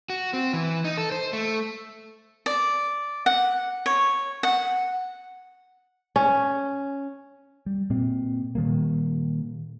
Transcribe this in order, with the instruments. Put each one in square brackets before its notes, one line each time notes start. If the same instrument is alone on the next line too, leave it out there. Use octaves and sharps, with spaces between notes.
[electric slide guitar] F#4
C4
E3
D#4
A4
C5
A3
[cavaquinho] D5
F#5
C#5
F#5
[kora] C#4
[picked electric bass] G3
A#2 C4
A#2 D#3 G3 A#3